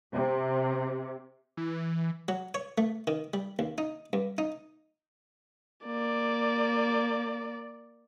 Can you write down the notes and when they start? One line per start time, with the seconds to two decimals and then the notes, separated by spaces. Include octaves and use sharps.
0.13 C3
1.57 E3
2.28 F#3
2.54 C#5
2.78 A3
3.07 D#3
3.34 G3
3.59 D#2
3.78 D#4
4.13 G2
4.38 D#4
5.87 A#3 D5